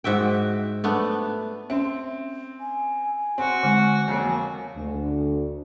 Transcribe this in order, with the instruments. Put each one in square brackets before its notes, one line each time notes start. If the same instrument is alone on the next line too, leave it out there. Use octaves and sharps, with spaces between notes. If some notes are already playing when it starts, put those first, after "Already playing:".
[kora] G#2 F#4 E5 G5
A3 B3 D4
[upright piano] C4 [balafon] C#4 E5
[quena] G#5
[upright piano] C4 [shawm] F#4
[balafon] D3 G#3
[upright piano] F2 F#3 A#3 [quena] G#5
[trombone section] D2